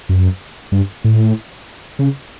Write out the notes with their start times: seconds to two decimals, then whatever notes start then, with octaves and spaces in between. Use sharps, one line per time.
0.09 F#2
0.72 G2
1.04 A2
1.99 C#3